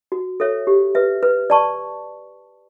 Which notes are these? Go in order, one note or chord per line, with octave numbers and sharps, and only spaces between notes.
F#4
A4 C#5 E5
G4
B4 E5
B4
D5 A5 C#6